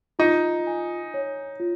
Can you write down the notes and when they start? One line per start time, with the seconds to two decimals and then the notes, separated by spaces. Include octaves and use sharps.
0.19 D#4 F4
0.67 G#5
1.14 C#5
1.60 F4